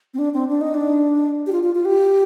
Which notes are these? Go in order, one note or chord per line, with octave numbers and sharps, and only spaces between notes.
C4
D4
C4
D4
D#4
D4
G4
F4
F4
F4
G4